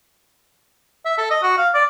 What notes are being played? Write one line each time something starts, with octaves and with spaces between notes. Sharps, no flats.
E5
A4
D#5
F#4
F5
D5